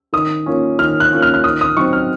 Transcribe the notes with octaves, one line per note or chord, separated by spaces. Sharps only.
D#3 D#6
A#3 C#4 F4
D#3 F6
F#6
A#3 C#4 F4
F6
F6
D#3 D#6
D#6
F#3 C4 D#4 C#6
F6